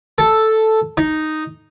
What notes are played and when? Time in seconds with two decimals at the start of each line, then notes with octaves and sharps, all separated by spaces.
0.18 A4
0.97 D#4